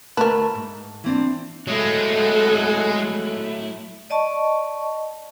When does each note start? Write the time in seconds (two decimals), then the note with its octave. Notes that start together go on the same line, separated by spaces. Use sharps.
0.17 D2 A3 A#4 B4 A5
0.55 G#2
1.04 E3 C4 D4
1.67 F#3 G#3 A3 E4 A4 F#5
4.10 D5 D#5 A5 C#6